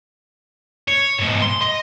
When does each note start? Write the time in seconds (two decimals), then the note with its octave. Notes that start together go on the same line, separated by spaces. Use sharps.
0.88 C#5
1.19 G#2 B2
1.42 C6
1.61 D#5